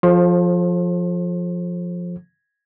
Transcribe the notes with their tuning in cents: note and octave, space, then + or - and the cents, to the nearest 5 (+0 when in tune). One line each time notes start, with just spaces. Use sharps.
F3 +10 A4 -25 C5 +35